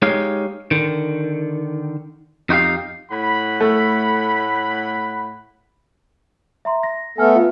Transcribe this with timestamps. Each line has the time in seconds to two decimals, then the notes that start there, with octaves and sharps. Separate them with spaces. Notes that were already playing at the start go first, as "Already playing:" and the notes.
0.02 G#3 D#4 G4 C#5 F5
0.71 D3 D#3
2.49 F2 D#4 F#4 G4 F5
3.11 A2 F#5 B5
3.60 A3
6.65 E5 A#5 C6
6.83 A#6
7.18 A3 B3 A4 G#5 F6
7.35 F4 B4 F5